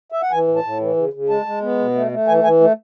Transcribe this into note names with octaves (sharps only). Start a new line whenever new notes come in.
E5
F#5
E3 G#5
A2
A5
A2
E3
C#3
C#3
G#3 A5
G#3
B3
B2
A3
A3
E3 G#5
E3 G#5
A3